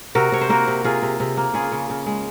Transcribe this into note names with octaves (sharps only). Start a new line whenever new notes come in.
C3 F#4 A#4
C3 C#5
C5
A#3 F#4 A#4
C3
C3 F4 G#4
C3
C3
A#3
C#3 F4 G#4
C#3
C#3
G#3